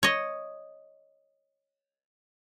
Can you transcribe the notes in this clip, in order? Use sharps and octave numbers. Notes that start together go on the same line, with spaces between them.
C#5 D#5